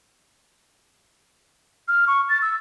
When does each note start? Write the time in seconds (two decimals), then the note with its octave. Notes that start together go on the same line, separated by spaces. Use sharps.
1.88 F6
2.07 C#6
2.29 A6
2.42 E6